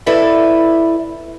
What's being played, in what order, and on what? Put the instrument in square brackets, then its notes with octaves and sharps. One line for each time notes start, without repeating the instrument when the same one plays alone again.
[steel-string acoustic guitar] E4 A4 B4 D5 E5